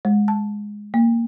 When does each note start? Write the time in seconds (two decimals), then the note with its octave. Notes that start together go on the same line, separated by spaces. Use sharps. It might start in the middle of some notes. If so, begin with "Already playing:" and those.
0.05 G#3
0.28 A5
0.94 A#3